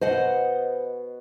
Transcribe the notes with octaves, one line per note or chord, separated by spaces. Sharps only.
B2 C5 D#5 F#5